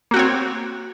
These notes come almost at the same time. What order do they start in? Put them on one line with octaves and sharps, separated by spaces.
A#3 F#4 C4 C#5